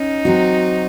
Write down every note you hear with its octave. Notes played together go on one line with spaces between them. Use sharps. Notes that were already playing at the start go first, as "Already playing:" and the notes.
Already playing: C#4 D#4
F#3 C4 F#4